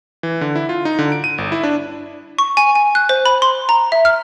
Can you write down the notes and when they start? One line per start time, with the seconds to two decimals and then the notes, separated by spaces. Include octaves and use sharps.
0.23 E3
0.41 D3
0.56 E4
0.69 F4
0.85 D#4
0.99 D3
1.12 D7
1.24 D#7
1.38 G1
1.52 E4
1.63 D4
2.39 C#6
2.57 G#5
2.75 G#5
2.95 F#6
3.09 C5
3.26 B5
3.42 C6
3.69 A#5
3.92 E5
4.05 F6